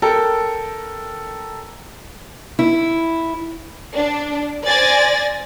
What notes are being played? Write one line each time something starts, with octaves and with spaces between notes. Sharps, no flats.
A4 A#4 G5
E4
D4
C5 D5 G#5 A6 A#6